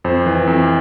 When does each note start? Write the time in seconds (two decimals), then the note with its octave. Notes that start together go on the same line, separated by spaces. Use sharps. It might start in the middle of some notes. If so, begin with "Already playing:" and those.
0.05 F2 C5
0.26 E3
0.47 F2